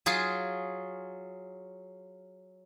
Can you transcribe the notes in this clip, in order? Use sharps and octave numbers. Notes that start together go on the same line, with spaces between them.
F#3 F4 G#4